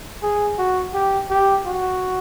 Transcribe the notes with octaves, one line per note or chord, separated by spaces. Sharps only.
G#4
F#4
G4
G4
F#4